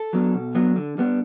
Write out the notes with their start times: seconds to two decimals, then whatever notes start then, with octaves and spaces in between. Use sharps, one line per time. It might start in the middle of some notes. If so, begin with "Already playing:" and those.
Already playing: A4
0.13 F#3 B3 D4
0.34 B2
0.55 F#3 B3 D4
0.76 D3
0.98 G3 B3 D4